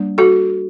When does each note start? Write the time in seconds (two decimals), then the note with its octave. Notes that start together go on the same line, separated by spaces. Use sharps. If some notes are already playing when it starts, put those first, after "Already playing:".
Already playing: G3 A#3 D4
0.18 F#4 A4